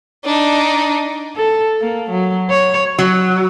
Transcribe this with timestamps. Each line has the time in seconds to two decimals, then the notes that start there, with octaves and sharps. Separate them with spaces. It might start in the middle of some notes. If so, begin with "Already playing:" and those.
0.25 D4 D#4
1.36 A4
1.81 A#3
2.10 F#3
2.50 C#5
2.99 F#3